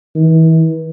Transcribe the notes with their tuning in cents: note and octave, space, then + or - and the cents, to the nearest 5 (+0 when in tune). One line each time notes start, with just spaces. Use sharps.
E3 -35